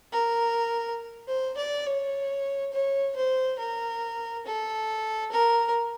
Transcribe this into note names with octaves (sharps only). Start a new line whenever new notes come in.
A#4
C5
D5
C#5
C#5
C5
A#4
A4
A#4